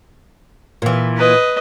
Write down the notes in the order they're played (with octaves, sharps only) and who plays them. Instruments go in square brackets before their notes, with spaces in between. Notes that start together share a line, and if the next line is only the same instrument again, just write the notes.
[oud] A#2 E3
[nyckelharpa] B4 D#5